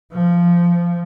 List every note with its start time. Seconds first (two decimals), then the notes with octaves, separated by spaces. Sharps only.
0.13 F3